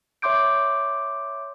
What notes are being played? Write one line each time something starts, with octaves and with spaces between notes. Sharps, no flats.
C#5 E5 C6 D6 G6 D7